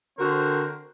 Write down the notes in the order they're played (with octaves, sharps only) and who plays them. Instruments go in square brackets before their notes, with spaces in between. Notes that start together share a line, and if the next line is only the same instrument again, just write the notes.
[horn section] D3 C4 F#4 A#4 C5